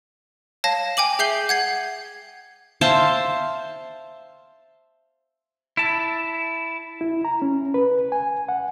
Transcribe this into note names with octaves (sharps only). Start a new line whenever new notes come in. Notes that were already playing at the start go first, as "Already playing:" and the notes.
C#5 F5 A5 A#6
G5 G#5 D6 F#7
G#4 E5 G6 C7 F#7 G7
F#5 G#6 C7
C5 E5 F5 A5
E4 A5
E4
A#5
C#4
B4
G#5
F#5